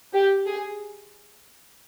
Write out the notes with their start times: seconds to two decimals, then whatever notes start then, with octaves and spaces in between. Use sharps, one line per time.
0.13 G4
0.46 G#4